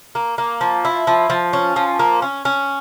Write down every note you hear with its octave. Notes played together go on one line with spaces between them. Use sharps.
A#3
A#3
F3
E4
F3
F3
C#4
F3
A#3
C#4
C#4